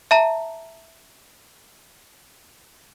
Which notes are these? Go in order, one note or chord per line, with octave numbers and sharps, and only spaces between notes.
E5 A5 A#5